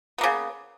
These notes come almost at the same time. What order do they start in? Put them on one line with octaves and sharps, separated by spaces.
B3 A#3 C#3